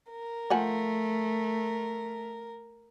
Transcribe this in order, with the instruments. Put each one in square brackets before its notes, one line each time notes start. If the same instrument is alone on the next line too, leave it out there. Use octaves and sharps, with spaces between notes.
[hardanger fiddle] A#4
[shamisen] F3 F#5 G#5 [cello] A3